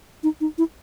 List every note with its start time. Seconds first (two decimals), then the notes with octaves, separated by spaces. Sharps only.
0.23 D#4
0.41 D#4
0.58 E4